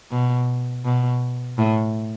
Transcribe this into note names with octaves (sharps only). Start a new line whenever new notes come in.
B2
B2
A2